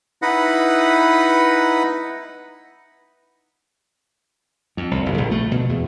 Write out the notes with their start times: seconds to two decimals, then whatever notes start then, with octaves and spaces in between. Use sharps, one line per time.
0.22 D#4 E4 B4 D#5 F#5 B5
4.77 F2
4.91 C2
5.06 F#1
5.18 A#1
5.31 A3
5.51 B2
5.69 E2